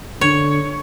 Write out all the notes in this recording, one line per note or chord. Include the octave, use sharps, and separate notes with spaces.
D3 C#5